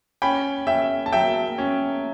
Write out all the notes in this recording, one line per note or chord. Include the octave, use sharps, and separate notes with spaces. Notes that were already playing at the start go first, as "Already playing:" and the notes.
C#4 G5 B5
C#4 E5 G5
A5
F#3 E5 G5
C#4